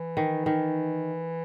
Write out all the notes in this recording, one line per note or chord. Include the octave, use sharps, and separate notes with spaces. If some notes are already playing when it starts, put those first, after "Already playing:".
Already playing: E3
D#3
D#3